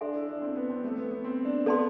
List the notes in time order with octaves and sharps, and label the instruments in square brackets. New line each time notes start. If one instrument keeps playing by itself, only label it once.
[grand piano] D4 [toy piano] A4 E5 G#5 C6
[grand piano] E4
D4
C4
B3
C4
A3
B3
B3
C4
D4
[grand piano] B3 [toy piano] A4 D5 A5 C6